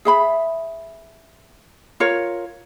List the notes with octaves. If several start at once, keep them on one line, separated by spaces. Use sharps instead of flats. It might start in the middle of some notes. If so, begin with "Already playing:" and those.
G#4 E5 B5
F4 A#4 C#5